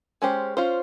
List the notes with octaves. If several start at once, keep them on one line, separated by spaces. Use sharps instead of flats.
G#3 C#4 G4 C5
C#4 F4 C5